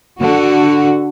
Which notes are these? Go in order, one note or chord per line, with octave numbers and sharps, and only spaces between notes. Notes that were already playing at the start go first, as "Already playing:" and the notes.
D3 F#4